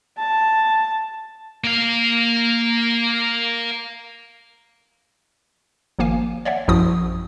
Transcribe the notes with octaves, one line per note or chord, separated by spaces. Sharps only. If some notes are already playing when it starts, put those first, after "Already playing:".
A5
A#3 F5
G#1 F3 A#3 F5 G#5
C#5 D5 E5 F#5
A#1 F#2 F3 E4 F#4 D#6